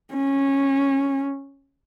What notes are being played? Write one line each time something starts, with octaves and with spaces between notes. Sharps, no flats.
C#4